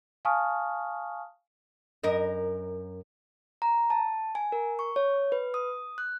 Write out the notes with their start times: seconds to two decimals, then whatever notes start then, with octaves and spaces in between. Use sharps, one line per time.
0.25 F5 G#5 A5 C#6 D#6 F6
2.04 F#2 A#4 D#5
3.62 A#5
3.90 A5
4.35 G#5
4.52 A#4
4.79 C#6
4.96 C#5
5.32 B4
5.54 D#6
5.98 F#6